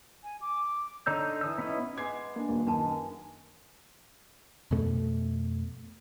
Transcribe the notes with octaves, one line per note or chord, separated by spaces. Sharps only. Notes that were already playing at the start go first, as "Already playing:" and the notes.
G#5
D6
D3 D#4 C#5 E6 G6
E3 D#6 E6
B3 C#4 D#4 E4 D#5
G#3 B3 D6 G#6 C7
A#3 D4
D#1 A#3
F#2 D#3 D4 A5
F2 B2 A3